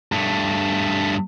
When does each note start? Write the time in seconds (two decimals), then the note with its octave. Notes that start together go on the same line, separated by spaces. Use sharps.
0.12 G2 A3